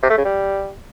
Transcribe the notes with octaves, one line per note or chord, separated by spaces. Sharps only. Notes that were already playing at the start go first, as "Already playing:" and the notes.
C3
A3
C#3
G3